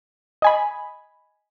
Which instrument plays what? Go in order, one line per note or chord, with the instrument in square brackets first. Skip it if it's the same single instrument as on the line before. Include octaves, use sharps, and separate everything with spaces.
[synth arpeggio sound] D#5 G#5 B5